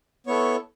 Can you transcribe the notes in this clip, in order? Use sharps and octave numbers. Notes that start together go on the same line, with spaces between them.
B3 E4 A4 C#5 C#6